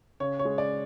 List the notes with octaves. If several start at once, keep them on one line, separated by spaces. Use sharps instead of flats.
C#3 C#5
C#5
G#3
D5